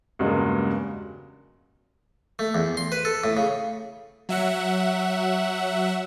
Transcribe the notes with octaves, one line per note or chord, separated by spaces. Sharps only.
E2 G2 C#3 F#3 G#3 A#3
A3
E2
C6
B4
A4
A2
C#3
F#3 E5 F#5